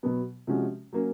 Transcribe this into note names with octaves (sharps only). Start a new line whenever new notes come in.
B2 F#3 B3
C3 F3 G#3 C#4 F#4
F#3 A#3 C#4